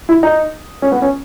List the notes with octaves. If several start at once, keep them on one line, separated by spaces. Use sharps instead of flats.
E4
D#4
C#4
B3
C#4